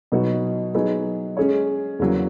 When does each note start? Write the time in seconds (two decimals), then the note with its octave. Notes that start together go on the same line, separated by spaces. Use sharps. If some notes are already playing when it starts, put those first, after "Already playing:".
0.12 B2 F#3 B3 D#4 F#4
0.75 F#3 B3 D#4 G#4
1.37 G#3 C#4 G#4 C#5
1.99 E2 C#3 F#3 A#3